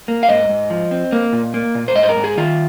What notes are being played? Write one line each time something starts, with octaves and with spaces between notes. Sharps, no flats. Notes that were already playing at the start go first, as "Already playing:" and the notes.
A#3
F5
G#2 D#5
G#2
F3
C4
A#3
A#2
A#3
A#2
C5
G#2 D#5
C5
A#4
G#2
G#4
D#3 F4